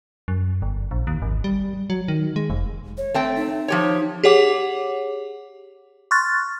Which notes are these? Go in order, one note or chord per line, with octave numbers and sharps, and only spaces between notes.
F#2
G1
A#1
D#2
G#1
G3
F#3
D#3
G#3
F1
C#5
A3 C4 G5
D#4
F3 G4 C#5
G4 G#4 C#5 F#5 D6
C6 C#6 F6 F#6 A6